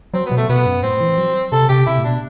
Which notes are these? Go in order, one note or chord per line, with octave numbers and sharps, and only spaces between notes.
F#3 C4
B3
B2
A3
B2 B3
F#2
A2 C4
E3
F#3
C3 A4
C3 G4
C3 E4
A2
B2 D4